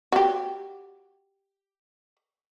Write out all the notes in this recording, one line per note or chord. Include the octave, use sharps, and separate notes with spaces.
F#4 G4